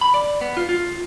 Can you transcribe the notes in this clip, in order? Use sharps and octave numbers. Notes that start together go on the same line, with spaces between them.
B5
D5
B3
F4
F4